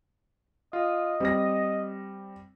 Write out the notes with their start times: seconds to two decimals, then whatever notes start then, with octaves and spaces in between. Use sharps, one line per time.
0.73 F4 D#5
1.20 G3 C4 A#6